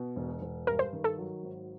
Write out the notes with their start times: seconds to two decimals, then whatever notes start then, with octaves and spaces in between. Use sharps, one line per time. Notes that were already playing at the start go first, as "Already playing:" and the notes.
Already playing: B2
0.16 E1
0.42 E1
0.67 G2 A#4
0.79 C5
0.93 D#3
1.04 A4
1.18 F#3
1.43 G#1